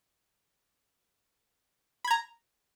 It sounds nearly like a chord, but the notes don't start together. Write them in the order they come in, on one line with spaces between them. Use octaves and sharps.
B5 G#6 A#5